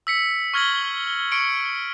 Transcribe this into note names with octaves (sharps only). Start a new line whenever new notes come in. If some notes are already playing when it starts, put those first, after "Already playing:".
E6 B6 C#7
C#6 F6 G#6 A#6 F#7 G7
C#6 C#7 D7